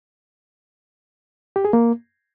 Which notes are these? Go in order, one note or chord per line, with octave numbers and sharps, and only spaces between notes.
G4
G#4
A#3